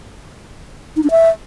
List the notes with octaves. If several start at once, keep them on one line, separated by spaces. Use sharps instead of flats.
D#4
D4
E5